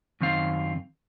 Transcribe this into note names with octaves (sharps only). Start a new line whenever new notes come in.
F#2 D#3 C4 F5